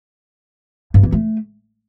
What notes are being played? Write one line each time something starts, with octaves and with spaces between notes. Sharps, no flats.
G2
E3
A3